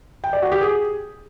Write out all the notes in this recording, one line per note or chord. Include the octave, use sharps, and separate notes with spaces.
G5
D5
F#4
G4
G#4